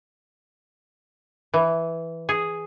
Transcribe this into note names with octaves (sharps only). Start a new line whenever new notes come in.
E3
G#4